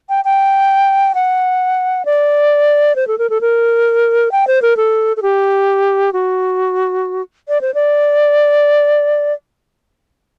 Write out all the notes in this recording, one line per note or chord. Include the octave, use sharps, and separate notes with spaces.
G5
G5
F#5
D5
C5
A4
A#4
A4
A#4
G5
C5
A#4
A4
A4
G4
F#4
D5
C5
D5